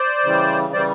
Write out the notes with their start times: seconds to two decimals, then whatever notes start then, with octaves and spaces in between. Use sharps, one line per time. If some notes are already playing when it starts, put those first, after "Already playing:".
Already playing: C5 D5
0.24 C#3 E3 G3
0.73 C#3 E3 G3 C5 D5